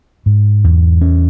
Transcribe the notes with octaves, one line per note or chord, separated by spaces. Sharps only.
G#2
E2
C#4